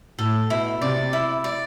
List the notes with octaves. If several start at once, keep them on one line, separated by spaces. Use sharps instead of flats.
A2 A4
B2 E4
C3 D5
E4
D5